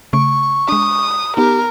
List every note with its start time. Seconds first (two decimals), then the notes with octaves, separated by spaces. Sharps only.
0.13 C#3 A3 C#6 D7
0.69 G#3 D4 D#6
1.37 B3 D#4 G4 A#4